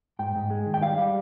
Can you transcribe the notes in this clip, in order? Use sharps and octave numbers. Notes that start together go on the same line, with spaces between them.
G#2 G5
G#2
G#3
D#3
G5
G3 F5
G3